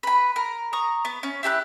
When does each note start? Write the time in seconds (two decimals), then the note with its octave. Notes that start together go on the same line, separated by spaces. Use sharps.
0.03 B4 B5
0.36 A#4
0.73 A#5 C#6 D#6
1.05 B3
1.23 C#4
1.43 E4 G4 A5 F#6